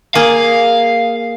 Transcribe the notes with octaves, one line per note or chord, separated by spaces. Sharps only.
A#3 G#4 F5